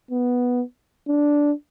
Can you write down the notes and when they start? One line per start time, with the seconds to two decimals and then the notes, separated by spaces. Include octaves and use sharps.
0.11 B3
1.08 D4